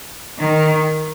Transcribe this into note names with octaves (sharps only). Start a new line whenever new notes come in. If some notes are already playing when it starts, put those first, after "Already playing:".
D#3